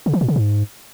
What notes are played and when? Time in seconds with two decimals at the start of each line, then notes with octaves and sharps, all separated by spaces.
0.06 C#3
0.14 E3
0.21 A#2
0.28 C#3
0.36 G#2